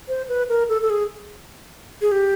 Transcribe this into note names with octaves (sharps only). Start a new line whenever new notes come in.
C5
B4
A#4
A4
A4
G#4
G#4
G4